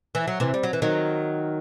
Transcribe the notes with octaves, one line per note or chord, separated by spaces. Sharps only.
E3
F#3
C3 E3
G3
F#3
E3
D#3 F#3